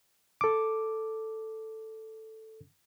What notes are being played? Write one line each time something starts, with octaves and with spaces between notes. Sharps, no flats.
A4 D6